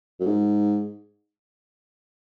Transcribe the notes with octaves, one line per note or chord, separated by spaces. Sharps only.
F#2
G#2